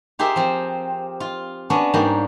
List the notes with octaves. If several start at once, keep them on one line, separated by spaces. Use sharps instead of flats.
F4 G4 G#4 A#4 C5 E5
F3 C4
F4
B3 C#4 D4 F#4
G#2 G3 A#3 G#4